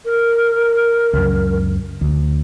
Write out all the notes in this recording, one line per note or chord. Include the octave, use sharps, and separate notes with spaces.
A#4
C#2 F#2
D2